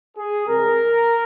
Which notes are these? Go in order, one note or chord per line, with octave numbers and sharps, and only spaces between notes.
G#4
C2 C3 E3 G#3 A#4